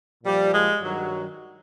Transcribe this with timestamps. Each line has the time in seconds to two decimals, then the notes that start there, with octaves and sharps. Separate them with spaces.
0.24 A#2 F3 G3
0.52 G#3
0.80 G2 D#3 F#3